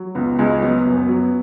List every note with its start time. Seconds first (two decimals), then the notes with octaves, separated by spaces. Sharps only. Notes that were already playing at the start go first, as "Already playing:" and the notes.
Already playing: F#3
0.15 C#2 B3
0.39 C#2 G#3
0.62 F#3 B3
0.85 F#2
0.97 B3
1.09 F#3